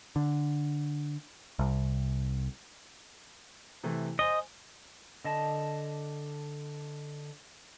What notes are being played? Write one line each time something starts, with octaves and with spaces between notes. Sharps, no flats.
D3
C2
C3 E3 A3
C5 D#5 G#5 G7
D3 D#5 A5